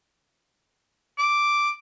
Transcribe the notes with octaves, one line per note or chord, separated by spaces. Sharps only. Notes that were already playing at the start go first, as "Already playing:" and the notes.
D6